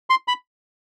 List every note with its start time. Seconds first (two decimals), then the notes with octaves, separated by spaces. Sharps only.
0.10 C6
0.28 B5